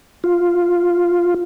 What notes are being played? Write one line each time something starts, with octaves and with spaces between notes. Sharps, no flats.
F4